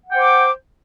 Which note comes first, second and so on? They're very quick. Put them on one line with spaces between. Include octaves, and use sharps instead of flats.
F#5 G5 C5 D6